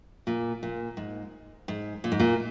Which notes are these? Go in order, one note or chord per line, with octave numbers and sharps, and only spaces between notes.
A#2
A#2
G#2
G#2
A#2
G#2
A#2